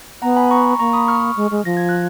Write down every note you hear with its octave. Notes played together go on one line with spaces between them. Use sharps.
B3 F#5 A#5
G#5 B5
A#5 C#6
A#3 A#5 C#6
B5 D#6
C#6 F6
G#3
G#3
F3 A#6
G#6
F#6